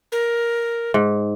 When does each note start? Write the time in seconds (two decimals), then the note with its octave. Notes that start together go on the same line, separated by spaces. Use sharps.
0.12 A#4
0.94 G#2